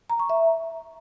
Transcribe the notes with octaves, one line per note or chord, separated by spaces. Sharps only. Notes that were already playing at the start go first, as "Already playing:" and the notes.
A#5
C#6
E5